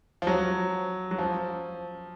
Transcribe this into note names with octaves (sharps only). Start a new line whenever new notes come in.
F3
F#3
F#3
F3